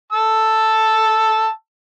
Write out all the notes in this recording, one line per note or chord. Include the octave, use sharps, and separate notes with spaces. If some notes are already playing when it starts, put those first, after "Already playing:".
A5 E6